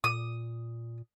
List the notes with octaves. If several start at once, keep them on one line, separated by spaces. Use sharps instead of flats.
A#2 D#6